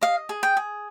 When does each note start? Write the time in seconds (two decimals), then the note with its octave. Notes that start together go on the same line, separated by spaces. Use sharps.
0.01 D#5 F5
0.29 G#4
0.43 G5
0.57 G#4